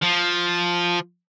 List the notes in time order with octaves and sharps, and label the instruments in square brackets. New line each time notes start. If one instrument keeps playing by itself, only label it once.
[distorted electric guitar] F3